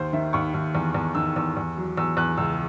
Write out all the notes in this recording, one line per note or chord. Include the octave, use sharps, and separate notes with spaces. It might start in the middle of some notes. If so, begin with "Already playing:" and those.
Already playing: D#2 C5
D#3 E5
D#2 C#6
D#2
E2
E2
D#3 E6
E2 E6
E2
F#3
E2 E6
E2 F#6
C#2 E6